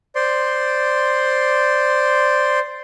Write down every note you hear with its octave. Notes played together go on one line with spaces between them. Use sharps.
C5 D5 C6